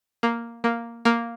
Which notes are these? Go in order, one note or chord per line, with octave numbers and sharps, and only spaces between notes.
A#3
A#3
A#3